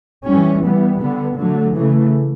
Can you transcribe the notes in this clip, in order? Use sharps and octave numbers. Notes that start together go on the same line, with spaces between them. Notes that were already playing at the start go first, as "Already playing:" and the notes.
E3 G3 C#4
E3 G3 B3
D3 G3 B3
D3 F#3 A3
C#3 E3 A3